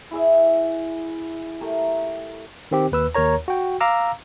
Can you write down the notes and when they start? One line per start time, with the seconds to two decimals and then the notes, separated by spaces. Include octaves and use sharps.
0.11 E4 G#4 E5
1.61 A3 G4 A#4
2.71 D#3 C4 G4
2.92 D#2 B4 E6
3.15 D#2 A#4 C#5 A#5
3.48 F#4 G5
3.81 F5 A#5 D6 E6